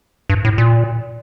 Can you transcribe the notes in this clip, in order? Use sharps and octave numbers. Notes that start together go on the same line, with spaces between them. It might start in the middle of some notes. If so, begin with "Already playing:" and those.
G2
A2
A#2